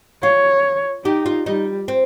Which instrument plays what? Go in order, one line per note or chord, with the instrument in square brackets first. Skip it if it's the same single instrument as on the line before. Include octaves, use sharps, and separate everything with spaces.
[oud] F4 [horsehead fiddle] C#5
[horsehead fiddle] D#4 [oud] G4
[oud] F4
[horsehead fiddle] G3 [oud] D#4
[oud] C4